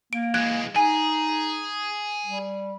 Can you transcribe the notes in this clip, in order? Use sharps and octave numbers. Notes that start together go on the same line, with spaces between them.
A#3 D7
E3 G#3 F#6 G#6 D7
D#4 G#4 G#5
G3